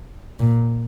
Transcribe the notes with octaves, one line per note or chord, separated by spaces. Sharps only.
A#2